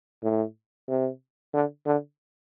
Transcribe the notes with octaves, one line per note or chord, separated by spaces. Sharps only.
A2
C3
D3
D3